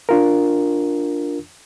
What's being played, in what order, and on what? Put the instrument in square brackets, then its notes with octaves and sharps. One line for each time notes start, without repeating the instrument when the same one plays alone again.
[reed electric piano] D4 F4 A#4